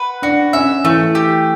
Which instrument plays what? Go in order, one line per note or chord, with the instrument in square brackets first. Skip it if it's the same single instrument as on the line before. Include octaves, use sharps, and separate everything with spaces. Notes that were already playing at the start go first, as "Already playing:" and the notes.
Already playing: [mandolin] B4 F#5
[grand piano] D4 [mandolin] F#4
[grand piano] C#4 [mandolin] E5
[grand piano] E3 [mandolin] A3
[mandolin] G4